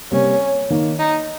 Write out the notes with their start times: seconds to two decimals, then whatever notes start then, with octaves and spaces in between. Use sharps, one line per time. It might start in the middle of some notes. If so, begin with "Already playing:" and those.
0.12 C3 G3 A#3 C#4
0.70 D#3 A#3 D#4
0.99 D#4